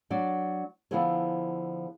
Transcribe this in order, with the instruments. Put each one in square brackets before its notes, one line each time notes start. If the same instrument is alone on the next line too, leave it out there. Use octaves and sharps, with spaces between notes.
[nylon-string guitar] F#3 D4 D5
D3 F3 B3 E4 G#4 C5